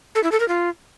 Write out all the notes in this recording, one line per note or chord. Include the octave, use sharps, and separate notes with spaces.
A4
E4
A4
A#4
F4